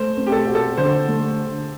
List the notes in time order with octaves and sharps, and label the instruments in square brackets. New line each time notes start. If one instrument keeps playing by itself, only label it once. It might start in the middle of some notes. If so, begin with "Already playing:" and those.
Already playing: [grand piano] A3 [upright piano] C5
[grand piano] C4
[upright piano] G4
A4
[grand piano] F#4
[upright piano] A4
[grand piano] D3 [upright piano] C5
[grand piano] A3